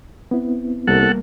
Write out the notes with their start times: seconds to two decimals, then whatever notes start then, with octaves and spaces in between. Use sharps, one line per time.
0.31 B3 C4 E4
0.87 C2 G3 A#3 A4 A#4 F#5